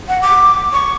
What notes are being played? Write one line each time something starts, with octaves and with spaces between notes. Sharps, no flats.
F#5
D6
C#6